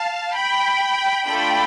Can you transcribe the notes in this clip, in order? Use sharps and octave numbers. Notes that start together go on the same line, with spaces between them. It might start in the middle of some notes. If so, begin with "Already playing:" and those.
Already playing: F5 A5
G5 B5
A3 D4 F4 A4 G5 B5